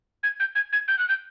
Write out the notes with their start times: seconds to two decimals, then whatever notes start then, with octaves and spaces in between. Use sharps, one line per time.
0.23 G#6
0.40 G6
0.55 G#6
0.73 G#6
0.88 G6
0.99 F#6
1.09 G6